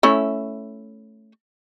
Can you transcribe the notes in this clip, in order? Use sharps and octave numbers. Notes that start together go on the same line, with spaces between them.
A3 C#4 E4